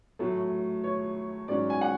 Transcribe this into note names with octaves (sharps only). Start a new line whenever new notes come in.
A2 F#3 A3
C#5
G#2 F#3 C#4 D5
G#5
F#5